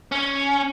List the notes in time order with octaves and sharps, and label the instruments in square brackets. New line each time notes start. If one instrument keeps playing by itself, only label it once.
[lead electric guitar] C#4